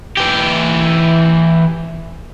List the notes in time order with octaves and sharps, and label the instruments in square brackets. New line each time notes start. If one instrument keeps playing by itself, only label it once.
[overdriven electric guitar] E3 G4